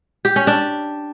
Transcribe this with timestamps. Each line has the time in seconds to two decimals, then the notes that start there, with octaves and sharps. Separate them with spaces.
0.25 G4
0.36 C#4
0.47 D4